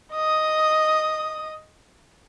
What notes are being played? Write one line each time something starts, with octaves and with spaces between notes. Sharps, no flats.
D#5 D#6